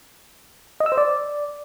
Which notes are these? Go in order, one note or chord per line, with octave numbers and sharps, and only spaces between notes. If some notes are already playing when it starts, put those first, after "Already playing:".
D#5
E6
C5
D5